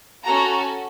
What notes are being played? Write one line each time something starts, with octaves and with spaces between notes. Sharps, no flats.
C#4 F#4 A4 A#5